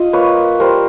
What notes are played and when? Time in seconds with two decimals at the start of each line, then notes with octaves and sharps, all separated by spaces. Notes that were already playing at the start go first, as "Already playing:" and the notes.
Already playing: F4 D#5
0.13 A#3 B4 C#5
0.60 G3 A#4 C5